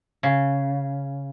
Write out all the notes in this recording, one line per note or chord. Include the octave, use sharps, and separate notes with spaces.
C#3